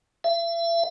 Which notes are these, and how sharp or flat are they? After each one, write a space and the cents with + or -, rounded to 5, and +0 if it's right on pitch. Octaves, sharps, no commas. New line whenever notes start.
E5 +40